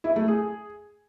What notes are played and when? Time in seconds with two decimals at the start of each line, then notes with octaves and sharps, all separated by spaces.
0.04 E4
0.16 A3
0.28 G#4